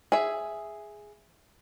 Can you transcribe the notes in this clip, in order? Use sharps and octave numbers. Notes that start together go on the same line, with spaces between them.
G#4 E5